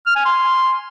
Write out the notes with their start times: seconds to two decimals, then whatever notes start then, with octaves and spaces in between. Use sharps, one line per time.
0.06 F6
0.16 G#5
0.25 C6